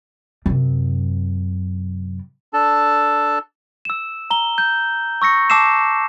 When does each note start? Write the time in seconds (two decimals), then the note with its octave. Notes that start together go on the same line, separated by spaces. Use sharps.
0.46 F#2 C3
2.54 D4 A4 A5
3.85 E6 E7
4.31 A#5 G7
4.58 G6
5.22 C#6 E6 A#6 C#7
5.50 A5 D6 E6 C7 E7